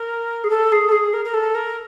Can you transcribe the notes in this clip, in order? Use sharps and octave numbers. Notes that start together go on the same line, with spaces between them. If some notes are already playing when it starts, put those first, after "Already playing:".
Already playing: A#4
G#4
A4
G#4
A4
G#4
A#4
A#4
A4
A#4